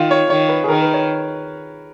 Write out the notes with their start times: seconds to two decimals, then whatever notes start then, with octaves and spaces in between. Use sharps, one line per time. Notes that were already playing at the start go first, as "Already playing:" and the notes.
Already playing: D#3 F4
0.11 C#5
0.30 D#3 C#5
0.49 B4
0.64 G#4
0.68 D#3 A#4
0.81 B4
0.94 C#5